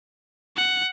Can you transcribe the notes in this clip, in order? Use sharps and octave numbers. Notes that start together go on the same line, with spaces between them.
F#5